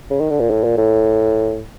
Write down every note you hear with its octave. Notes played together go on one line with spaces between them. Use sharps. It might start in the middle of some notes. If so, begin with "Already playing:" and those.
C#3
D#3
D3
A#2
A2
A#2
A2